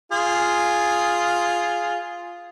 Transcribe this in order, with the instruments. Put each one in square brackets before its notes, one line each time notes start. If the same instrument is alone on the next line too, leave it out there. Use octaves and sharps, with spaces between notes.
[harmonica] F4 G#4